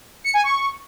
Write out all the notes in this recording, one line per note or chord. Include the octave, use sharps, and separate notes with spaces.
C#7
G#5
C#6